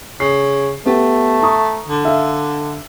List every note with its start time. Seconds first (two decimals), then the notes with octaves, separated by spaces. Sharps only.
0.20 C#3 C7
0.86 A3 B3 G4
1.42 A#5 C#6 D#6
1.88 D3
2.05 E5 F5